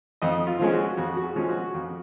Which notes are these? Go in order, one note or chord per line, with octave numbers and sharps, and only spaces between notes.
F2 D#5
F4
F3 G#3 C#4
F#4
F2 F#4
F#4
G#4
F3 G#3 C#4
F#4
F2